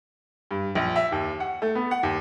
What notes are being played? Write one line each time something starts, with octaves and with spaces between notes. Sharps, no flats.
G2
A#1
E5
D#2
F#5
A3
B3
F#5
D#2